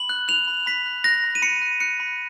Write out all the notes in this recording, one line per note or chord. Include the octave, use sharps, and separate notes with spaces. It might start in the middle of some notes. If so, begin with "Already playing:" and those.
Already playing: B5 F#7
F#6
F#6 F7
B5
B5 B6
F#6
F#6 A#6
B5
D#7
B5 C#7
F#6
F#6 C#7
B5